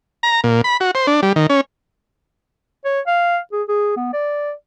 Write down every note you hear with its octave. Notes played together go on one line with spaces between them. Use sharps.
A#5
A#2
B5
F#4
C5
D4
G3
D#3
C#4
C#5
F5
G#4
G#4
B3
D5